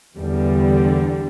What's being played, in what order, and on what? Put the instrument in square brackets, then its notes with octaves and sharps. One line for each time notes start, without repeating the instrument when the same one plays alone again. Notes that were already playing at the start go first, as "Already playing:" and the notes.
[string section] E2 D3 G3